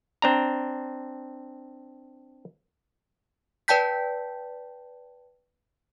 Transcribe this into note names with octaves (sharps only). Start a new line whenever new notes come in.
C4 D4 A#5
B4 D5 G5 A5 G6 B6